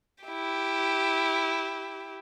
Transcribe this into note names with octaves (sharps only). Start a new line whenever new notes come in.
E4 G4